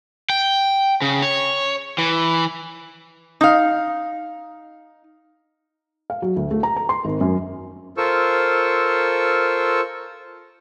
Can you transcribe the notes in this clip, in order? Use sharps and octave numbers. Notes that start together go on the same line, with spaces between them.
G5
C#3
C#5
E3
D#4 F5
F5
F#3
D2
A3
A#5
A#5
C6
G#1
F#2
F4 A4 A#4 C5 C#6 E6